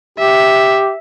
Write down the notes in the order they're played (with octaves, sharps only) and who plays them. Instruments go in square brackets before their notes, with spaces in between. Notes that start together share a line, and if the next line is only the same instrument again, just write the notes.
[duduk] G4 [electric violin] E5